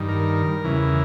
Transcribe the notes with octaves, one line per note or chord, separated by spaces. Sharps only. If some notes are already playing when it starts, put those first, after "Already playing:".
Already playing: G2 D#3
A#4
E2 C#3 E3